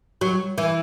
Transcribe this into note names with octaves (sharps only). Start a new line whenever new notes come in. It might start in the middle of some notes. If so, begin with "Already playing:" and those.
F#3
E3